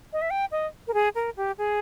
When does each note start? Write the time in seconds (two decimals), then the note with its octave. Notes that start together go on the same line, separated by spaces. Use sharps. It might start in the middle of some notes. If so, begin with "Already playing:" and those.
0.13 D#5
0.22 E5
0.31 G5
0.52 D#5
0.88 A#4
0.94 G#4
1.15 A#4
1.37 G4
1.58 G#4